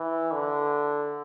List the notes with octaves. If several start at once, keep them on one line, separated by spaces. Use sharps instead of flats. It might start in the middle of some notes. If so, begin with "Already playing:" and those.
Already playing: E3
D3